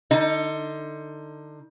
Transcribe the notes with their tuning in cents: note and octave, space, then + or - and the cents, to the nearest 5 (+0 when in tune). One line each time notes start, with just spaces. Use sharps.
D3 +30 D#4 +25